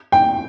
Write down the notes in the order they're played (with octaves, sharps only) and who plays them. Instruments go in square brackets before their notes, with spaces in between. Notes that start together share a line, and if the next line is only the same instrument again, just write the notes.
[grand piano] G5